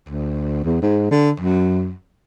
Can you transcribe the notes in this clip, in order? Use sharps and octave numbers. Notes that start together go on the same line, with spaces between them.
D2
E2
G#2
D3
F#2